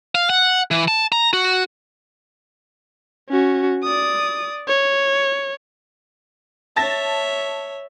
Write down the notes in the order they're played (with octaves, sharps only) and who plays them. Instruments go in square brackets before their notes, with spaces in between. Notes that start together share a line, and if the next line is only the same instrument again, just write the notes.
[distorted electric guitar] F5
F#5
E3
A5
A#5
F#4
[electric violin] C#4 F#4
D5 D#6
C#5
[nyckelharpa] C#5 E5 [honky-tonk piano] A5 A6 A#6